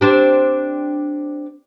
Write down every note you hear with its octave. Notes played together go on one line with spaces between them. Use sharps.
C4 D4 G4